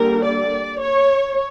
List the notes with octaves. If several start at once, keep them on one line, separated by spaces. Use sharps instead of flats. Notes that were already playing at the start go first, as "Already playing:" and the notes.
Already playing: D3 G3 A#3 A#4
D5
C#5